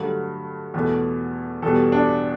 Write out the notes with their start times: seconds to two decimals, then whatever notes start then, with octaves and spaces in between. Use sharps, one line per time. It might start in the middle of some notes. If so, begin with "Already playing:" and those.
Already playing: G2 D3 F#3 A3
0.74 E2 B2 A3
1.62 E2 B2 G3 A4
1.92 D4